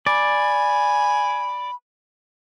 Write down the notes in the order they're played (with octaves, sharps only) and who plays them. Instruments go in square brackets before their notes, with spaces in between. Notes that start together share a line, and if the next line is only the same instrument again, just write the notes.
[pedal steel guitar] D5 [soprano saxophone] G#5 [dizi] B5